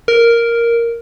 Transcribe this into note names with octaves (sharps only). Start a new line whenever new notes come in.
A#4